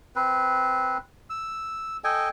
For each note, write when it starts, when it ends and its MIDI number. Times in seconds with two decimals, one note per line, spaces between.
0.16 0.98 60
0.16 0.98 71
1.30 1.97 88
2.04 2.29 69
2.04 2.29 75
2.04 2.29 79
2.04 2.29 80